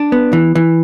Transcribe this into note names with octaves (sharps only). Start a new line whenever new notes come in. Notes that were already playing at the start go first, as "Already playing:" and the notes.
Already playing: D4
B3
E3
E3